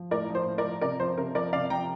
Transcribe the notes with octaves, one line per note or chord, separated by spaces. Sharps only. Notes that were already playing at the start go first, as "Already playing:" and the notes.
Already playing: F3
A2 A#4 D5
F3
C5
A2
A#4 D5
F3
C3 A#4 D5
F3 C5
C3 A#4
F3 A#4 D5
C3 D5 F5
F3 G5 A#5